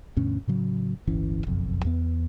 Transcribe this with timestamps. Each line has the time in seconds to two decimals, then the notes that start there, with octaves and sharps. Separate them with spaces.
0.17 D2 G2 B2 C#4
0.47 A2 C#3 F#3
1.07 D1 G1 E3 C#4
1.47 F#1 B1 F2
1.85 E2 B3